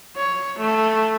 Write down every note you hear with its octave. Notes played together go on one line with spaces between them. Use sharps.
C#5
A3